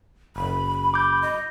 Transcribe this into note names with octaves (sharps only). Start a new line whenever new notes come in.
F#1 B5
D6 G6
D#5